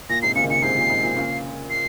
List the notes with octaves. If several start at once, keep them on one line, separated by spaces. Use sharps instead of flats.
A#2 A#6
G#2 C3 C7
A#2 C#3 C#7
D#3
A#2 C#3 C#7
G#2 C3 C7
A#2
G#2
A#2
A#2 C#3
C7